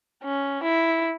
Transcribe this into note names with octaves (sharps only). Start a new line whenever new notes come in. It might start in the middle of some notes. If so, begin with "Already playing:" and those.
C#4
E4